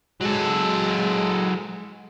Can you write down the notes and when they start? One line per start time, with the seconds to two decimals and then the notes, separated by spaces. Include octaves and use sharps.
0.21 F#3 G#3 A4